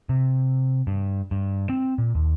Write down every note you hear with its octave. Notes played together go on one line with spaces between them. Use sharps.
C3
G2
G2
C4
A#2
D#2